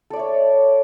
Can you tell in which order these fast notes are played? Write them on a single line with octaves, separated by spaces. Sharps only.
A4 D5 E5 C#5